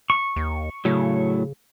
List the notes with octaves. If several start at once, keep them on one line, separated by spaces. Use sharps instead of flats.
C#6
D#2
A2 C#3 F#3